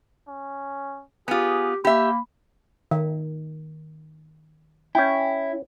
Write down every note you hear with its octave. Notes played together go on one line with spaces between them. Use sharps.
C#4
B3 F4 G4 G#4
A#3 G4 E5 B5
D#3
C#4 E4 G5